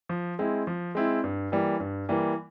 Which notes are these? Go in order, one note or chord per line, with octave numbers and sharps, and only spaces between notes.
F3
G#3 C4 E4
F3
G#3 C4 E4
G2
E3 G3 A#3
G2
E3 G3 A#3